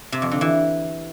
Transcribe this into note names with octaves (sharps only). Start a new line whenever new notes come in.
C3
F2
D3
E3